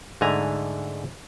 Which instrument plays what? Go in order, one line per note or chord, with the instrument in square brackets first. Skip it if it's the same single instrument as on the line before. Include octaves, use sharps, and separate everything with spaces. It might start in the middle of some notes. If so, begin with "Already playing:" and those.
[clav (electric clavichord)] G#2 D3 A3 G#5 A#5